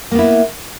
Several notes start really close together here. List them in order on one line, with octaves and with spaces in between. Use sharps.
A#3 B3 E4